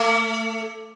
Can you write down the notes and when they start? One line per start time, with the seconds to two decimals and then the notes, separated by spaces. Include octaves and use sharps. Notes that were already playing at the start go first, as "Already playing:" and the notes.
Already playing: A3